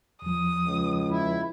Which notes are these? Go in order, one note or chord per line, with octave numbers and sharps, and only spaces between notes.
E2 F3 D#6
C#2
E4